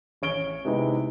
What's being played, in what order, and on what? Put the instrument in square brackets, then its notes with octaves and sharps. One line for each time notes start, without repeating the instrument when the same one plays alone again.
[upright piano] A1 C#5 D7 G7
C3 G#3 B3 D#4 E4